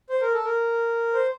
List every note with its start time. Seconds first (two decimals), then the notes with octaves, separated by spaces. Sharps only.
0.09 C5
0.21 A#4
0.34 A4
0.45 A#4
1.13 C5